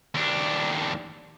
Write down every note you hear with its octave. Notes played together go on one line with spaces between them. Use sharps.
D#2 D4